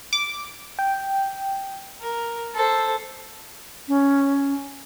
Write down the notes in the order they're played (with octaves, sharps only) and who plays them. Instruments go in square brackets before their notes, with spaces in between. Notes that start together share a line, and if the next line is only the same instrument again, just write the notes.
[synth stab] D6
[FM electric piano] G5
[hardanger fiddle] A#4
A4 C5
[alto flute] C#4